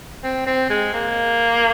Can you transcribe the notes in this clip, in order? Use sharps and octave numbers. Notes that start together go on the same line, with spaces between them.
C4
C4
G#3
A#3